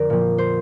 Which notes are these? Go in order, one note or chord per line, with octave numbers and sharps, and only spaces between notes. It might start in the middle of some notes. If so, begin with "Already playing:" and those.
Already playing: F2 D3 A#4 D5
A#2 F3
C5